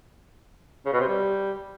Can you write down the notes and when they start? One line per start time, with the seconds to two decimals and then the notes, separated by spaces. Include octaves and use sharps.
0.85 C#3
0.93 B2
1.00 C3
1.08 G3